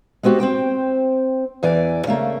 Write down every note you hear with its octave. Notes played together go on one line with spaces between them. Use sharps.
G#3 B3 C4 F#4 G4
C4 C5 G5
E2 E3 D5 G#5
C#3 A3 A#3